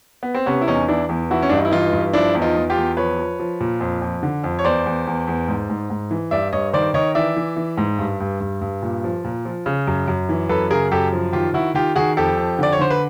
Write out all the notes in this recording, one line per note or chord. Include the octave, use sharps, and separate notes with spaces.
B3
C4
C3 B3 C#4
E4
E2 C#4 D#4
E3 D4 E4
E2
E3 E4 F#4
C#4
G2 D4
D#4
E4
E3 D#4 F4
G2
F3 D4 E4
E2
D#4 F4
E2
F4 G4
E2
F3 B4 C#5
F3
F3
A#2
F2
F2
D3
F2
C#5
E2 C5 D5
E2
E2
E2
G#2
G#2
G#2
E3
G2 D5 E5
G2 C#5 D#5
D#3 C5 D5
D#3 C#5 D#5
E3 D5 E5
E3
E3
G#2
G2
G2
G2
G2
A#2
F3
A#2
F3
C#3
F#2
F#2
E3
F#2 A4 B4
C#3 G#4 A#4
F#2 G4 A4
F3
D#3 F4 G4
D#3 E4 F#4
D#3 F4 G4
D#3 F#4 G#4
F2 G4 A4
F2
D3 D5
C#5
D3 C5
B4